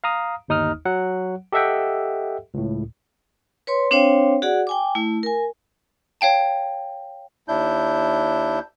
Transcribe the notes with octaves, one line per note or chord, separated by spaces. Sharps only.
F5 A#5 D#6
G1 D#2 D#4 D#6 F6
F#3 F#5
G4 A4 D#5 E5 F#5 G5
C#2 A2
B4 C#5 C6
C4 D4 C5 C#5 F5 G5
F#4 G#4 D5 F#5
G5 G#5 D6
A3 E4
A#4 G#5
C#5 F5 G5 A5
D#2 D4 E4 G6